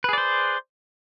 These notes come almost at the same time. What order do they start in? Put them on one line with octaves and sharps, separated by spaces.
B4 G#4 D5 C5